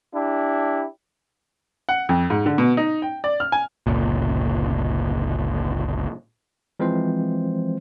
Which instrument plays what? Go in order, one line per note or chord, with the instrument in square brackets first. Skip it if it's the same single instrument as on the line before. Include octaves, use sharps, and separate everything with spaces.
[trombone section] D4 E4 G4
[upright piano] F#5
F2
G#2
D3
B2
D#4
G5
D5
F6
G#5
[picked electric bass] G1 C#2 A#2
[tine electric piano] E3 F3 G#3 C4 C5